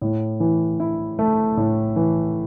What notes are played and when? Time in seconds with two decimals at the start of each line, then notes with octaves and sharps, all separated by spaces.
0.02 A2
0.40 E3
0.80 E4
1.19 A3
1.57 A2
1.96 E3